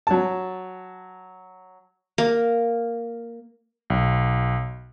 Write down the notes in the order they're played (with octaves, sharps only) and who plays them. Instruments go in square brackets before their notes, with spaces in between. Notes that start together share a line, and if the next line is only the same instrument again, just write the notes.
[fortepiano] F#3 A5
[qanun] A#3
[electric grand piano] B1